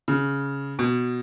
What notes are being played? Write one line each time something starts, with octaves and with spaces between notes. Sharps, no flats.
C#3
B2